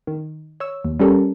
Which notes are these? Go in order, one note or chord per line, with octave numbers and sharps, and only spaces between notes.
D#3
C#5 E6
D#2
G3 C#4 G4 A4 A#4